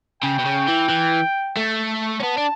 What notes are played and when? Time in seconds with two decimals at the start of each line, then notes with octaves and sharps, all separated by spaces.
0.23 C#3 G5
0.39 B2
0.45 C#3
0.68 E3
0.89 E3
1.57 A3
2.20 C#4
2.23 B3 A5
2.38 D4